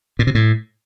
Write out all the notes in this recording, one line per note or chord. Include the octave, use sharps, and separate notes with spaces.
A#2
C3
A2